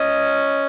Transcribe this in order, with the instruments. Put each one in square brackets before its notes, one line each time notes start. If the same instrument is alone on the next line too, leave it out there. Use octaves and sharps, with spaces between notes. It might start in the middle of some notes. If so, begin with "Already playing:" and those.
Already playing: [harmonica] C#4 [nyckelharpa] D#5